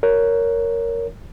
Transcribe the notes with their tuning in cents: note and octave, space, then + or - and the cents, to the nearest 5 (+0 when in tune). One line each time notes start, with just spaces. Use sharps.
A#4 +0 C#5 +15